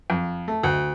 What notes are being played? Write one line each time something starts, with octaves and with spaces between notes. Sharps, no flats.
F2
A3
D2